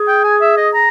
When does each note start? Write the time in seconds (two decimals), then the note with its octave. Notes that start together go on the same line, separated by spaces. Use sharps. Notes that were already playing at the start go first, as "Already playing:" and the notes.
Already playing: G#4
0.08 G5
0.24 G#5
0.41 E5
0.57 D#5
0.74 A#5